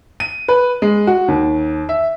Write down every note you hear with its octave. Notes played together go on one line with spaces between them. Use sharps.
D#7
B4
G#3
F#4
D#2
E5